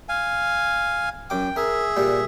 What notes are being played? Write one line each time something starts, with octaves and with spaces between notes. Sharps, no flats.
F5 G#5
F#2 G5 D6
G#4 A#4 E5
A#2 G3 G4